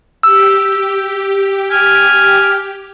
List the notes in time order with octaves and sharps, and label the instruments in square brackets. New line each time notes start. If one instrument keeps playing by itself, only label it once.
[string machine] G4 [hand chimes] E6
[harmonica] G#5 F6